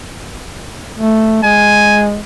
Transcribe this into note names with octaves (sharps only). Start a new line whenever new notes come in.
A3
G#3 G#5